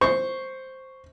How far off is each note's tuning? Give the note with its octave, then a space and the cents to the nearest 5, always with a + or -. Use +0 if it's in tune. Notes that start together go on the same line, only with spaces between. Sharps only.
C5 +0 C#6 +0